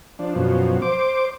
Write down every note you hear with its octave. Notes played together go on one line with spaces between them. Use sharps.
F3 D4
F#2 B2 F3
C5 D6